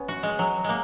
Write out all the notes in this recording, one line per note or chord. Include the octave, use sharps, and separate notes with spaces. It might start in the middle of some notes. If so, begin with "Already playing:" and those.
Already playing: B3 C#4
F#4
G#3
F#3
G#3 A#3